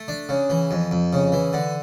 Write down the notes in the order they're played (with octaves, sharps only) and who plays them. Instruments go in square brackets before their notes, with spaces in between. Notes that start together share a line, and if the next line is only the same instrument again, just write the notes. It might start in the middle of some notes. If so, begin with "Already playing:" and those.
Already playing: [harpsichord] A3
D4
C#3
E3
F2
F2
C#3
E3
D3